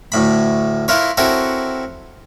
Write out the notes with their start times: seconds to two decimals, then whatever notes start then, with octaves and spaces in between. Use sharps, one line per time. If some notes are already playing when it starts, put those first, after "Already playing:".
0.12 D2 A2 B5
0.88 E4 F4 A#4 B4 C#5
1.17 C4 E4 F#4 A4 A#4 C#5